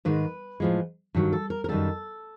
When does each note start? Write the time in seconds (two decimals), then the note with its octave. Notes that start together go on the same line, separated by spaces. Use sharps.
0.05 G#2 D#3 G#3 B4
0.60 A2 F3 G#3
1.15 G2 D#3 F#3
1.33 A4
1.50 A#4
1.64 A#4
1.69 F#2 D#3 G3 A4